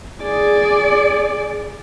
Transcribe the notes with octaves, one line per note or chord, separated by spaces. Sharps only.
G#4 D5